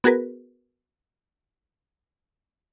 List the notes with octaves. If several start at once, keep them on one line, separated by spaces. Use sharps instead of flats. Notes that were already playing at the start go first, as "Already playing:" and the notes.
B3 F#4 G#4 A#4 B4